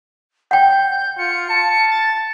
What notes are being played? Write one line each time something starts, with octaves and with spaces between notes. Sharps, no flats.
F#5 G5 G6
F4 C#7
A5
A6